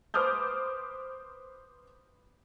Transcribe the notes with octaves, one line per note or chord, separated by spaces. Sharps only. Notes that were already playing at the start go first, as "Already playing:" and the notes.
B4 C5 D6 D#6 F6 G6